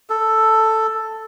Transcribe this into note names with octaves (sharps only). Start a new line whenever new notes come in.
A4